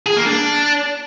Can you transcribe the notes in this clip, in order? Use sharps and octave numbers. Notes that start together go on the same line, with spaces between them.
G#4
A#3
D4